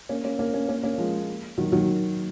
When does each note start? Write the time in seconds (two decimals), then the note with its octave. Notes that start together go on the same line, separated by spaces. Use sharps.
0.09 A#3 C#4
0.24 A#3 C#4
0.39 A#3 C#4
0.54 A#3 C#4
0.68 A#3 C#4
0.83 A#3 C#4
0.98 F3 G#3
1.58 D#3 F#3
1.72 D#3 F#3